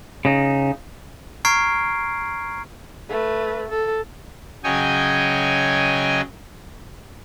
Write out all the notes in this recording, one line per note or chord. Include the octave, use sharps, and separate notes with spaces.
C#3 D#4
A#5 C#6 F6 G#6 C7 D7
A3 B4
A4
C#3 F#3 C#5 D#5 G5 G#5